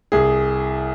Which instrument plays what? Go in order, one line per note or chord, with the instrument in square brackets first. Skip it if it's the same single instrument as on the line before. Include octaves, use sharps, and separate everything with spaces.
[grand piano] C2 G#4